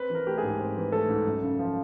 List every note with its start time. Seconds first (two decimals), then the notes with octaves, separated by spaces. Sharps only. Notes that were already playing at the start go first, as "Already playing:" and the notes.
Already playing: C4 B4
0.10 E3
0.15 A#4
0.27 A3 G4
0.38 G#2 G#4
0.59 C4
0.76 E3
0.92 A3 A4
1.09 G#2
1.26 F#2
1.43 C#3
1.59 F3